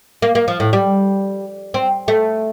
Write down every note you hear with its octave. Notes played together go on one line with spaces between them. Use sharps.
A#3
A#3
F3
A2
G3
C4
A3